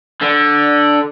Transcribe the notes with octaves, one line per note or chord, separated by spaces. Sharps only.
D3